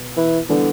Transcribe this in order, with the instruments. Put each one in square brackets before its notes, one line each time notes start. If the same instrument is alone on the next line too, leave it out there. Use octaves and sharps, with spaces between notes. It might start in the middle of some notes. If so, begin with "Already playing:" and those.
Already playing: [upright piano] B2 B3
[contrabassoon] E3
[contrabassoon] D3 [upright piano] E3 G3 B3 D4 G4